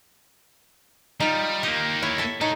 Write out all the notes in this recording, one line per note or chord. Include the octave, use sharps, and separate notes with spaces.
G3 D#4 F4
A#3 D#4 G4
E4 C#5
A4 E5
D#4 A4 C#5